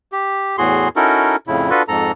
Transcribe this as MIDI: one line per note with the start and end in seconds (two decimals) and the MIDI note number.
0.12 0.56 67
0.58 0.88 40
0.58 0.88 45
0.58 0.88 66
0.58 0.88 68
0.58 0.88 84
0.96 1.36 61
0.96 1.36 63
0.96 1.36 64
0.96 1.36 66
0.96 1.36 69
0.96 1.36 70
1.47 1.70 41
1.47 1.70 45
1.47 1.70 49
1.47 1.70 64
1.70 1.83 62
1.70 1.83 65
1.70 1.83 66
1.70 1.83 69
1.70 1.83 71
1.88 2.12 41
1.88 2.12 44
1.88 2.12 69
1.88 2.12 82